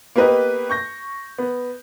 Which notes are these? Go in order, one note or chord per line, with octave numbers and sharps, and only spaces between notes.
A#3 B3 G4 B4 D#5
C#6 G6 A#6
B3